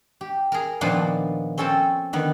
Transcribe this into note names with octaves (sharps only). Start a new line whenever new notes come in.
G4
G#4 A#4
A#2 D#3 F3 B3 D4 C6
C4 C#4 A4 G5 A5
D3 D#3 B3